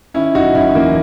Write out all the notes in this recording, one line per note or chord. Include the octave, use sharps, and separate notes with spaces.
D#3 C#4 E4
F#1 D#4 F#4
F#1 C#4 E4
E2 A#3 C#4